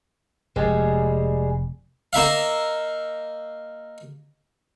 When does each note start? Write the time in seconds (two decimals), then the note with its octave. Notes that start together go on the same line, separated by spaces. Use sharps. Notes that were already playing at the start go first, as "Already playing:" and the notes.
0.56 F1 F2 G3 G#3 G#4
2.13 A#3 D#4 E5 F5